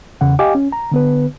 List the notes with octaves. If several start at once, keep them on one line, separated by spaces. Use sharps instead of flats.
E2 C#3 F#5
G4 D#5 F5 G5 G#5 D6
C#4
A#5
D3 B3 B4